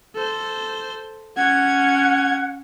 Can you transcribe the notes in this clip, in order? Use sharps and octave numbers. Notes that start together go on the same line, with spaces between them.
A4 C5
C#4 F#5 G#6